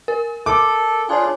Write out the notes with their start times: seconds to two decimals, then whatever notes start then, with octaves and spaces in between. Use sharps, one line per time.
0.08 A#4
0.46 A4 D6
1.09 D4 F4 G#4 C#5 G#5